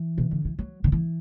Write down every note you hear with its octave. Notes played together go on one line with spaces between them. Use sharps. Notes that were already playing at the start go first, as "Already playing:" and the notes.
Already playing: E3
B2
D3
E3
F#3
D3
E3